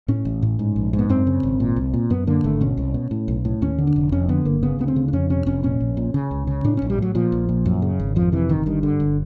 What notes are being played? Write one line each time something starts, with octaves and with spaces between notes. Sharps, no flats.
A2 C#4
A1
A2
G#2
A#1
G#2
B3
F#2 C4
C#3
G#1
A#2
C2
A#2
F#2 B3
D3 A#3
G#1 A3
B2 C#4
C2
B2
A2
B1
A2
D#2 C#4
D3
D4
F1
F2 C#4
D3 B3
G1 A#3
C#3 B3
D2 B3
C4
C#3
D4
F2 C#4
C3 C#4
F1 C#4
A#2 C#4
A#1
A#2
C#3
C#2
C#3
A2 D4
A#1 C#4
G3
A2 F#3
A#2 F3
A#1
A#2
F#2
C#3
G#1
F2 F3
C3 E3
G1 D#3
G2 D#3
D3
G1